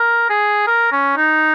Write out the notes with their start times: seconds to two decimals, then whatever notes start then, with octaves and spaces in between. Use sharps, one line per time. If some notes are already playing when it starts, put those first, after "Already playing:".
Already playing: A#4
0.30 G#4
0.67 A#4
0.92 C#4
1.17 D#4